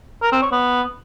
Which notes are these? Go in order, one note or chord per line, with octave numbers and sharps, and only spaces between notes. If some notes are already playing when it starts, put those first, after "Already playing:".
A#4
C4
C#5
B3